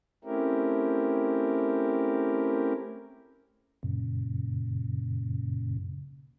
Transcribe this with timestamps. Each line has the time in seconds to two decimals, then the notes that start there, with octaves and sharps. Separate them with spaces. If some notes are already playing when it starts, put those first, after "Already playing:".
0.24 A3 C4 C#4 E4 G4 A#4
3.83 F#2 A#2 C#3